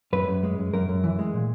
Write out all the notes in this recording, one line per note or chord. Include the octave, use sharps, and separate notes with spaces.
F#2 B4
F#2
G#3
F#2
F#2 A#4
F#2
E3
G#3
A#2